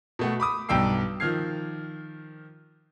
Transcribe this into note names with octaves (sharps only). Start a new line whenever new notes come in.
B2 A3 F#5
B5 D6 D#6
B1 G2 D5 G5 E6 C7
D#3 F3 F6 G#6 C7